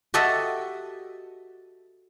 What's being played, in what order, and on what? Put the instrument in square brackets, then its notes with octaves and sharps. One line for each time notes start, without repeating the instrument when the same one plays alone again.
[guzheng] F#4 G4 A4 D#5 E5 F#5